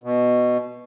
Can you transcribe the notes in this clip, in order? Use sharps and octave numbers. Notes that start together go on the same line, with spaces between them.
B2